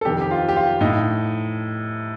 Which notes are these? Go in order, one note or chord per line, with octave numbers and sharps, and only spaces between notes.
A4
F2 C3 D#3 G4
G4
F4
G4
F4
A2 D#4